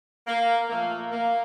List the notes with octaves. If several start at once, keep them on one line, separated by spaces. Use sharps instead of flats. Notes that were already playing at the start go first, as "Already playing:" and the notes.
A#3
A#2 F3 A3 A#3
A#3